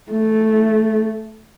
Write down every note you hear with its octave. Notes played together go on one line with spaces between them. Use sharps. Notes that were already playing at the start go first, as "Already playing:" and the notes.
A3